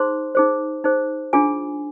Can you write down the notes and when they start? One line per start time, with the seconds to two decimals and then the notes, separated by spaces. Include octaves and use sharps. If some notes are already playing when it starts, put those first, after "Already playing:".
Already playing: D#4 G#4 C5 C6
0.35 D#4 G#4 C5
0.84 D#4 G#4 C5
1.33 D4 F4 G#4 G#5